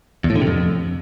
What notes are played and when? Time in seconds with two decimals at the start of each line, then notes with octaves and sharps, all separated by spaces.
0.24 E2
0.30 A2
0.36 D3
0.41 C3
0.47 F2